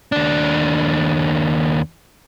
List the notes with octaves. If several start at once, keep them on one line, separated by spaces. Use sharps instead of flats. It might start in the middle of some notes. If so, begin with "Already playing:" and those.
D#2 D4